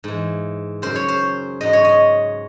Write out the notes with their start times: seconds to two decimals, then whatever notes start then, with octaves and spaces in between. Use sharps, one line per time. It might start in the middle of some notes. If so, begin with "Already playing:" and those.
0.04 G#2 E3
0.82 F#2 C#3 F#3 C5
0.96 C#5
1.08 C5
1.61 G#2 F#3 D#5
1.73 C#5
1.85 D#5